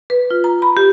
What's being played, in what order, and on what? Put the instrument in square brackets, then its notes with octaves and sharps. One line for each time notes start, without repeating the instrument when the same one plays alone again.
[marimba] B4
F4
A#5
B5
G4